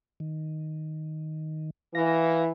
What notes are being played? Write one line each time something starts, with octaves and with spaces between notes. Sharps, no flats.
D#3
E3 F5 A#6